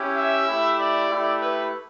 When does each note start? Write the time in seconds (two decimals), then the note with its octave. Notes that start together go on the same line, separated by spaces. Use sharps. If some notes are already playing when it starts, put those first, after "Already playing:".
Already playing: C#4 E4 G4
0.16 E5
0.46 A3 E4 G4
0.78 D5
1.10 A3 E4 G4
1.41 B4